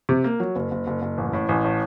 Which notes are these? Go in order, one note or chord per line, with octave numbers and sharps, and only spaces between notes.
C3
A#3
F#3
F#1
F#1
F#1
F#1
A1
A2
A1
A2